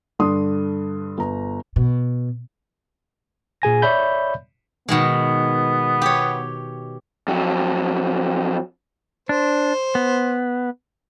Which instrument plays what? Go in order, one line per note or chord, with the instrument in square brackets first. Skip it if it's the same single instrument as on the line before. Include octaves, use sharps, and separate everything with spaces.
[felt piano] G2 D3 D4 C6 D#6
G1 A#5
[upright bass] B2
[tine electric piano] A#2 G#4 G#5 A#6
C#5 D5 E5 B5 G6
[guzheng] B2 D#3 G#3 [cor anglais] B3
[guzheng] G4 C#5
[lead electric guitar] F2 F#3
[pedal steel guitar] D4 [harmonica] C5
[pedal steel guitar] B3